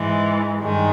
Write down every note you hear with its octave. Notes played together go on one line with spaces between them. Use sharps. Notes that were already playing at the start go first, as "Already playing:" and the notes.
Already playing: G#2 E3 G#3
G2 D#3 G#3